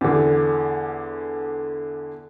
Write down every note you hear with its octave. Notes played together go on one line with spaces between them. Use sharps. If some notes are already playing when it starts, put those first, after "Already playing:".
E2 D3